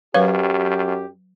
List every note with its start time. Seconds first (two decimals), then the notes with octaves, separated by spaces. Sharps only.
0.14 F#2 F#3 G4 B4 C#5 F5